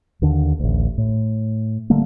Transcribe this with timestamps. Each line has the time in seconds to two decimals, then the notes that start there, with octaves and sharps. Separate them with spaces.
0.22 D#2 D3
0.60 A1 D2
0.98 A2
1.90 D3 G3 A3 A#3